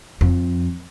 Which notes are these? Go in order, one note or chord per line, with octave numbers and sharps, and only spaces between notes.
F2